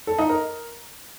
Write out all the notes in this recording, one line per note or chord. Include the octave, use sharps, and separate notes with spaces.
A4
D#4
A#4